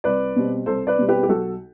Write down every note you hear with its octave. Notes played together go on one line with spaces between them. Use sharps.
C2 B4 D5
B2 G3 C4
C2 A4 C5
B4 D5
B2 G3 C4
G4 B4
G4
B1 F#4 A4